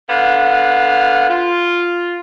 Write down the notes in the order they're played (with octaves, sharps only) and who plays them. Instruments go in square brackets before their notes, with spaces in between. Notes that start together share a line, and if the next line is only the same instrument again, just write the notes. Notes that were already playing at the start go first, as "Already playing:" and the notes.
[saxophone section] D3 B3 F5
F4